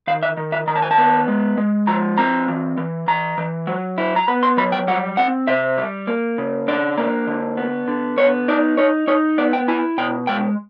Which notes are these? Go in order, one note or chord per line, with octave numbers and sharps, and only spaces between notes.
D#3 F5
E5
D#3
E5
D#3 A#5
A5
G#5
A5
B3
G#3
G#3
F3 A#5
C4 A#5
E3
E3
E3 A#5
E3
F#3
E4
A#5
B3 B5
C6
F#3 B5
G5
G3 F#5
C4 F#5
C3 E5
G3
A#3
C#3
D4 D5
A#3
D3
B3
D3
B3 C#5
D#4 D5
D#4 C#5
D#4 C#5
B3 D5
G5
E4 G#5
B2 G5
G#3 G5